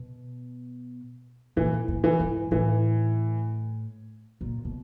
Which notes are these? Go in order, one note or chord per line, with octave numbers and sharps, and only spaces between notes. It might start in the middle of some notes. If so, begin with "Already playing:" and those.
Already playing: B2
A#2 E3
A2
E3
G#2
A2 E3
A#2
B2